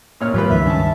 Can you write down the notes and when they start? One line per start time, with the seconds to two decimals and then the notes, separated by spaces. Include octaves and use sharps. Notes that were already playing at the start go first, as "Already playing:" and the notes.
0.21 A#2 C#5 F6
0.34 G#2 F3 F#3 F4 G4 B4
0.50 C#2 G2 D#3 E5
0.66 C#4 A5